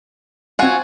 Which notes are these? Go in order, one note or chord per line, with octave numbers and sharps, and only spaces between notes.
C4 F4 F#4 G#5